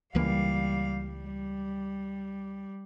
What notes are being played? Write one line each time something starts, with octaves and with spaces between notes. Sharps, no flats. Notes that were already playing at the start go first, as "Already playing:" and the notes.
C#2 E3 G3 A#3 F5
G3